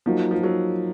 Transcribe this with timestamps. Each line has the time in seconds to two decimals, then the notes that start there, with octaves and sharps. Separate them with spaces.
0.06 F3 F#3 A#3 D#4 F#4
0.31 F3
0.43 F#3